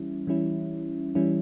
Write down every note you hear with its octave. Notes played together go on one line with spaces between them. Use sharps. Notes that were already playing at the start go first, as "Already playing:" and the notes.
Already playing: E3 G3 C#4 E4
E3 G3 C#4 E4
E3 G3 C#4 E4